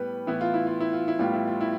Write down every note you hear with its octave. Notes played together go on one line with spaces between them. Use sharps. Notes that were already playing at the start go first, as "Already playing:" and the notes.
Already playing: A2 G3 B3 B4
A2 E3 B3 E4
F4
E4
F4
E4
F4
E4
A2 G3 B3 F4
E4
F4
E4